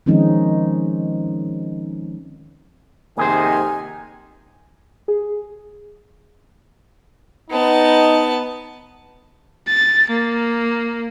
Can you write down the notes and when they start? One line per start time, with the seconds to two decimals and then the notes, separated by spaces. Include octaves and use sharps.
0.06 D#3 F3 G#3 C4 C#4 D#4
3.17 F2 C3 D#3 A#3 G#4 C5 G#5
5.08 G#4
7.51 B3 D#4 A5
9.68 A6
10.11 A#3